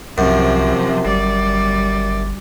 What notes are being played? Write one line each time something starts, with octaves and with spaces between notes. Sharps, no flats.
C2 F#2 C3 F3
G1 G3 D5